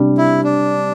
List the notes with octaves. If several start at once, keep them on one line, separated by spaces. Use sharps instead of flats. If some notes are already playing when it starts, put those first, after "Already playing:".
Already playing: C3 G3 D4
E4
D4